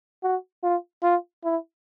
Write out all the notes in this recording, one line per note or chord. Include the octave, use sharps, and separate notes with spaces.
F#4
F4
F4
E4